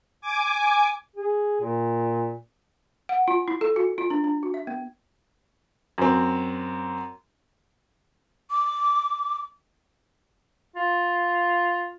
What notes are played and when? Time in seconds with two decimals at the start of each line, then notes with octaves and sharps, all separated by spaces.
0.21 G#5 D6
1.16 G#4
1.61 A#2
3.09 F#5
3.28 F4
3.48 E4
3.61 A4
3.76 F#4
3.98 F4
4.10 D4
4.24 D4
4.43 F#4
4.54 E5
4.67 B3
5.98 F#2 C4
8.51 D6
10.76 F4